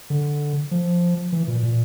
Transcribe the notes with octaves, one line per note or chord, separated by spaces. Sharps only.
D3
F3
E3
A#2
A#2